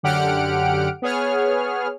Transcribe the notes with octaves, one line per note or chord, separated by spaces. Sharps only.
F#2 D3 G4 F#5 F6 D7
B3 G#4 C#5 F6